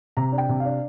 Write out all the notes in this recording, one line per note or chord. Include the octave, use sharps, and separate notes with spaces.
C3 A#5
D4
G5
C3
F5
D4